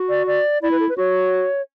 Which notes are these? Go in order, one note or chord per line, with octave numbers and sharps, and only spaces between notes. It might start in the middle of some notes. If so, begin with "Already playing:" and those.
Already playing: F#4
D5
D5
E4 D5
B4
A4
B4
F#4 C#5